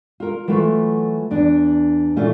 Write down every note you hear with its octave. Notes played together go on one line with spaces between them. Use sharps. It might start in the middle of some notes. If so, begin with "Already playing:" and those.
F4 A#4
E3 F#3 A3 F4
E2 D4
A#2 E3 A3 C#4 F4